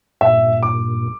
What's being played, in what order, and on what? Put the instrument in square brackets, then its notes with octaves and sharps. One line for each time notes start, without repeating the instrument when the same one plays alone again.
[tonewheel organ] G2 A#2 [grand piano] E5
[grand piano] D6